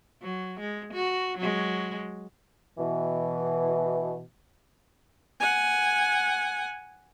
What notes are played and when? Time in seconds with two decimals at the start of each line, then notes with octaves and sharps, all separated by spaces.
0.22 F#3
0.60 G#3
0.93 F#4
1.38 F#3 G#3
2.78 B2 E3
5.40 F#5 G#5